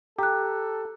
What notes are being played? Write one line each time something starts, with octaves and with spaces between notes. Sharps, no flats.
G4 A4 A#5 F#6